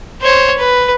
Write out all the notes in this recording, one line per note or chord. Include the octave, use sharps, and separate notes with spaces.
C5 C#5
B4